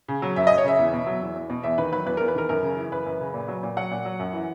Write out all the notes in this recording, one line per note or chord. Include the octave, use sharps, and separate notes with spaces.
C#3
F#3
F#2 E5
D#5
F#2
C#5
C#3 E5
E2
B2
F#3
E2
E2
B2
E2 E5
D#3 B4
F#3 B4
E2 B4
A#4
E2
B4
D#3 A#4
F#2 A#4
C#3
E3
F#2 B4
F#2
C#3
A#2
F#3
A#2
F#3 F#5
A#2
F#3
F#2
E3